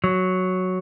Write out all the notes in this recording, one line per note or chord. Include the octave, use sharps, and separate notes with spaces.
F#3